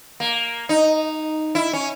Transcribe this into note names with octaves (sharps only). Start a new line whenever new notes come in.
A#3
D#4
E4
C#4